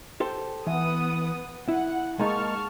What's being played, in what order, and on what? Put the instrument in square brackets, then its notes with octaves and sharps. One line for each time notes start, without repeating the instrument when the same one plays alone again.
[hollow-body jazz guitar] G4 A4 C5
[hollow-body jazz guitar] E3 [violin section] B3 F#5 D#6
[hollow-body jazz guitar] E4 [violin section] F#5
[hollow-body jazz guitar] G#3 A#3 D#4 [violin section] A5 C#6 F6